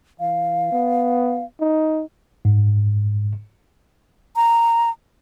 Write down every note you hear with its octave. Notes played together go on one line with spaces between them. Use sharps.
E3 F5
B3
D#4
G#2
A#5